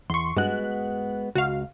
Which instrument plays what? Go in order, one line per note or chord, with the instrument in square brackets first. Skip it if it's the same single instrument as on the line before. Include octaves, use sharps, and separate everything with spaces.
[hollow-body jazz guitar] E2 [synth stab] C6 C#6
[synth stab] G2 F#6 [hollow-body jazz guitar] G#3 B3 F#4
[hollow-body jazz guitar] C#2 [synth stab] F#4 F5